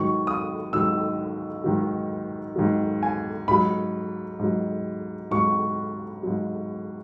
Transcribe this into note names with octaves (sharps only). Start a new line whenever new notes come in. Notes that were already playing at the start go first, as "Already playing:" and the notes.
Already playing: G#2 D#3 F#3 C#6
D#6
G#2 D#3 F#3 E6
G#2 D#3 F#3
G#2 D#3 F#3
G#5
G#2 F#3 B5
G#2 F#3
G#2 F#3 C#6
G#2 F#3